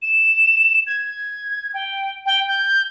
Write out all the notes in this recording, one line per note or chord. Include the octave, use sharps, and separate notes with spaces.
E7
G#6
G5
G5
G6